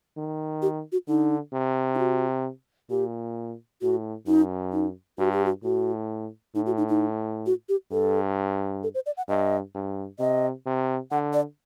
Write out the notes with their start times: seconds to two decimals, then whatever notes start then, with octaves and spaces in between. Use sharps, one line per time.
0.17 D#3
0.62 G4
0.92 F#4
1.08 D3 D#4
1.53 C3
1.95 D#4
1.99 F#4
2.90 A#2 G4
3.82 A2 F#4
4.27 F#2 D#4
4.73 D#4
5.18 G2 F#4
5.32 G4
5.45 F#4
5.63 A2 F#4
6.55 A2 D#4
6.66 F#4
6.77 D#4
6.89 D#4
7.46 F#4
7.69 G4
7.91 G2 A4
8.83 A4
8.94 C5
9.06 D5
9.17 F#5
9.28 G2 D#5
9.75 G2
10.19 C3 D#5
10.66 C3
11.11 D3 F#5
11.33 D5